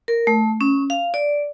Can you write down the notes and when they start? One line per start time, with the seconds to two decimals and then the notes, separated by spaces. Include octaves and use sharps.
0.08 A#4
0.27 A3
0.61 C#4
0.90 F5
1.14 D5